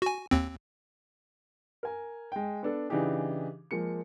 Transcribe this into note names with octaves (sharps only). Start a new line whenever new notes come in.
F#4 G#5
D#2 C4
A#4 G#5
G#3 G5
B3 D4 A4
C#3 E3 D4 D#4 G4 G#4
F3 G#3 A#3 C#7